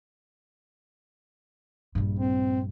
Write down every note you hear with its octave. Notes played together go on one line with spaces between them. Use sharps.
A#1 G2
C4